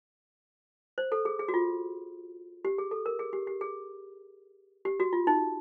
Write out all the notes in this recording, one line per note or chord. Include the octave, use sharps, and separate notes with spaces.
C5
A4
G#4
G#4
F#4
F4
G4
G#4
A4
A#4
G#4
G4
G4
G#4
G4
F#4
F4
D#4